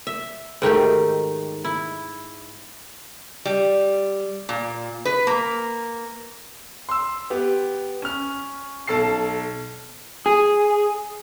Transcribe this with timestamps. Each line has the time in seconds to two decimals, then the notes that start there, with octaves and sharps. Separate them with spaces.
0.07 E5
0.62 G#2 D#3 A3 G4
1.64 E4
3.45 G3
4.49 A#2
5.05 B4
5.27 A#3
6.89 C6 E6
7.30 B3 G4
8.02 C#4 F6
8.87 B1 A4 A5 C7
10.26 G#4